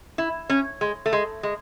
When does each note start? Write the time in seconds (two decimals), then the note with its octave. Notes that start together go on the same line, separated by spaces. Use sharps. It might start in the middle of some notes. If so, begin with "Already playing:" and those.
0.18 E4
0.50 C#4
0.81 G#3
1.06 A3
1.13 G#3
1.43 G#3